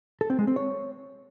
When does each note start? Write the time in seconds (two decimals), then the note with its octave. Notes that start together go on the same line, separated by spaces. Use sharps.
0.21 A4
0.30 C4
0.39 G#3
0.47 C4
0.56 C#5